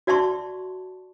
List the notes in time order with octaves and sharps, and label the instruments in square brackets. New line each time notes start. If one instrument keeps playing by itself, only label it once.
[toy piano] F#4 D5 E5 A5 C6 C#6